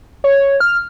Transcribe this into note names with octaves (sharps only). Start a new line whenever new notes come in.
C#5
F6